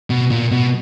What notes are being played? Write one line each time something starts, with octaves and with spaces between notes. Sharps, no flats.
B2
A#2
B2